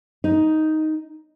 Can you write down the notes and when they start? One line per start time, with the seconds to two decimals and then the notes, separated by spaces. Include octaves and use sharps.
0.24 D#4